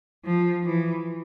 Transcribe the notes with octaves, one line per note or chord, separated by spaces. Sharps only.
F3
E3